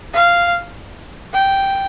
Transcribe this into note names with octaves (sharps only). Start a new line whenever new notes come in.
F5
G5